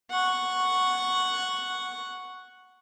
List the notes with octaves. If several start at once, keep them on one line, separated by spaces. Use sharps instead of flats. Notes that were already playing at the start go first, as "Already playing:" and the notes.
F#5 C#6